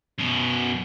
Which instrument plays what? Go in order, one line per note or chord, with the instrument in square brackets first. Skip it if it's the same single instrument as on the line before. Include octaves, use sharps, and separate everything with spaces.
[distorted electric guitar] F#2 B2